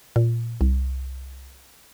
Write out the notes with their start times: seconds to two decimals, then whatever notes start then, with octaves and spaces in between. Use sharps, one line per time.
0.16 A#2
0.61 C2